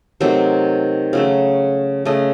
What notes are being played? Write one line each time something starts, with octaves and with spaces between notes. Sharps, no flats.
C3 D#3 F#3 A3 C5
C#3 F#3 A3
C#3 A3 D#5